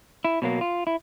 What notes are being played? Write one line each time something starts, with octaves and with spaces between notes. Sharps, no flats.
E4
B2 F#3 A#3
F4
E4